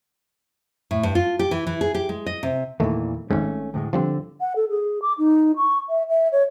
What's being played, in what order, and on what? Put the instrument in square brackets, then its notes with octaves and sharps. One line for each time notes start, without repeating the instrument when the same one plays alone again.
[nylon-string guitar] A2
G2
F4
G4
E3
E3
G#4
G4
G#3
D#5
C3
[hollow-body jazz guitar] E2 A#2 E3 [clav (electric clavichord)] D#3 A3
[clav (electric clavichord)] G#1 G#2 [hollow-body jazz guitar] A3 C#4
[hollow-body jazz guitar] D2 A2 G#3
[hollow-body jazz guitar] D3 [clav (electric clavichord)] F3 G3 C4
[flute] F#5
A4
G#4
D6
D#4
C#6
E5
E5
C#5